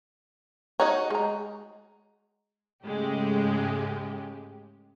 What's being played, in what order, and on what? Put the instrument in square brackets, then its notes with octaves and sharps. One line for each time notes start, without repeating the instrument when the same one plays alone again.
[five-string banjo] D#4 F#4 C#5 [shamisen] D#5 A#5
[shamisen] G#3 A#5
[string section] G#2 C#3 G#3 A3 G4